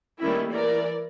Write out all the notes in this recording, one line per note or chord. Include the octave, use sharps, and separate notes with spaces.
D#3 G3 A3 A#3 C#4 E4
E3 A#4 D5